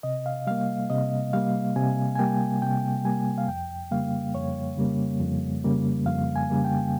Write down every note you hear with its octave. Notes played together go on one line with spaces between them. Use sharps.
C3 D#5
F5
G3 A#3 F5
C3 D#5
G3 A#3 F5
C3 G#5
G#5
G3 A#3 G5
C3 G5
G3 A#3 G#5
F5
F2 G5
C#3 G3 A#3 F5
F2 C#5
C#3 G3 A#3
F2
C#3 G3 A#3
F2 F5
G#5
C#3 G3 A#3
G5